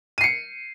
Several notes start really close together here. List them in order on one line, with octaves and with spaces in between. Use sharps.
D#7 C7 C#7